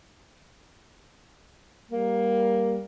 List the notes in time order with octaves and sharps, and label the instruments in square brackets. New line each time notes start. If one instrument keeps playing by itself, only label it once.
[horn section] G3 A#3